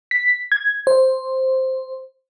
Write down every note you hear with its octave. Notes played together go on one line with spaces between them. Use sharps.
B6
G#6
C5